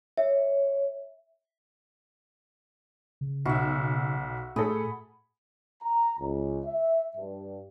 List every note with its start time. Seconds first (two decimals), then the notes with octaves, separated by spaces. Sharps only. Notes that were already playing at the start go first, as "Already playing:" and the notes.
0.18 C#5 E5
3.21 C#3
3.46 B1 F#4 E5
4.56 A2 A3 G#4 A4 B5 D#6
5.83 A#5
6.20 C#2
6.66 E5
7.17 G2